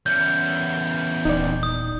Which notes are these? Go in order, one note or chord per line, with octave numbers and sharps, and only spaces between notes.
E2 C#4 G6
D#1 D#4 D5
D#6